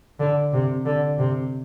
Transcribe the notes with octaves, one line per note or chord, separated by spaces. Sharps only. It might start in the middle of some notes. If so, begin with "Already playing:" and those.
D3
C3
D3
C3